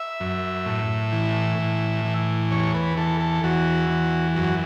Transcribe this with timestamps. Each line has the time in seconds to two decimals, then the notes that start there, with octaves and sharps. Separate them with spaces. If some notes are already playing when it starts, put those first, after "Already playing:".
Already playing: E5
0.20 F#2
0.66 A2
1.13 E3
1.59 A2
2.05 E3
2.51 E2 C#5
2.74 B4
2.97 E3 A4
3.21 A4
3.44 E2 F#4
3.90 E3
4.36 F#2 F#4